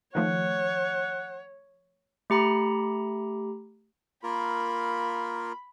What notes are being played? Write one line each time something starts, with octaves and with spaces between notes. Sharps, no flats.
D#3 F3 A3 C#5 F#5
A3 G4 A#5 B5
A#3 F4 A#4 B5